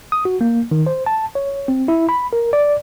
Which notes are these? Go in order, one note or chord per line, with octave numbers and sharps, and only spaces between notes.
D#6
F#4
A#3
D#3
C5
A5
C#5
C4
E4
B5
A#4
D5